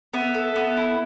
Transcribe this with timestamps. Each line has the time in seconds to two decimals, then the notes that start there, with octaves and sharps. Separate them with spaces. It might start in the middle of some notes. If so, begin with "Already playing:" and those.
0.14 B3 E5
0.34 A4
0.56 B3
0.77 E4